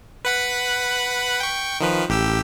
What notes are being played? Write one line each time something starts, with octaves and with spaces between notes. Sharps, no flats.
B4 F#5 B5
G5 C#6
D#3 F3 B4
A1 G4 E6